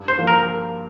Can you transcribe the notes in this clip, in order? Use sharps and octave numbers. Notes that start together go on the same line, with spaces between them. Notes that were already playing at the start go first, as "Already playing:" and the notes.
Already playing: G2
C5
F3 A#3 F4
A#4